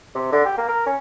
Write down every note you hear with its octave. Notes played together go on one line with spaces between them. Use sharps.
C3
D3
G4
A#3
A#4
C#4